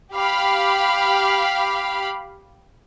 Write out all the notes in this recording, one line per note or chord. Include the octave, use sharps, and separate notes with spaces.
G4 F5 B5